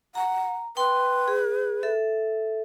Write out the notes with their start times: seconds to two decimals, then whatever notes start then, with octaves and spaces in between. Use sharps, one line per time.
0.15 F#5 A#5
0.77 B4 G5 C6
1.28 G#4
1.83 A4 E5